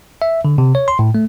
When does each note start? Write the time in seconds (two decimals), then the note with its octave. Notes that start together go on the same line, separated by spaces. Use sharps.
0.22 E5
0.45 D3
0.58 C3
0.75 C#5
0.88 C6
0.99 A2
1.15 A3